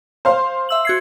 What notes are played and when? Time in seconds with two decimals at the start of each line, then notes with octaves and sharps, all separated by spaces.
0.25 C5 F5
0.69 E5 E6 F#7
0.85 F#4 G#6 C7